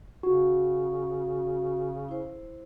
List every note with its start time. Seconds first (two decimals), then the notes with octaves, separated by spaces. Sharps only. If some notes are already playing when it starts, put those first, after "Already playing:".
0.23 C#3 F#4
2.09 E4 C5